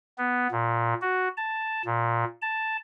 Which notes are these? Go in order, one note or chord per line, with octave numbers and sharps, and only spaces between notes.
B3
A#2
F#4
A5
A#2
A5